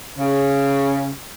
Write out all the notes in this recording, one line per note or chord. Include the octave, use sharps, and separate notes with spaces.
C#3